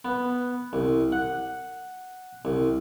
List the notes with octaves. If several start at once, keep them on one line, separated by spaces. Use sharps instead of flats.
B3
C2
F#5
C2